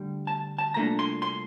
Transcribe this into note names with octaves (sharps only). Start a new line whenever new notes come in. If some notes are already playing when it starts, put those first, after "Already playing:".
Already playing: D2 D3 G3
A5
A5
C2 A#2 A3 D4 A#5
C6
C6